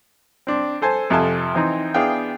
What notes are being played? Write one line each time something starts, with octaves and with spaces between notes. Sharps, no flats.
C4 D4
A4 C5 G#5 A5
F2 C3 F4 A4 G#5 A5
E3 C4 D#4
B3 D4 E4 G#4 F5 G5